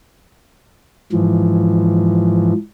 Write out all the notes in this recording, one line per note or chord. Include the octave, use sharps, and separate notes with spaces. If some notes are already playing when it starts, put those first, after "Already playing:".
G#2 E3 F3